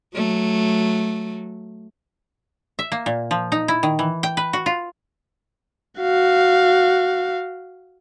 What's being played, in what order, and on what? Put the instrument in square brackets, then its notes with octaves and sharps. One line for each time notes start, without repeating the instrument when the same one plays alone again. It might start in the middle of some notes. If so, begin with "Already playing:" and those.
[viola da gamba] F#3 A3
[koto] E5
A#3
A#2
F3
D#4
E4
D#3
E3
G5
B4
F#4
F4
[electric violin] F#4 F5